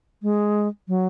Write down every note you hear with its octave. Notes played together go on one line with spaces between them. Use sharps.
G#3
F#3